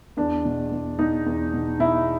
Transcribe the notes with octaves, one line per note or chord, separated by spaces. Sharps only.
E2 D4
B2
E2
B2 D#4
E2
B2
B2 E4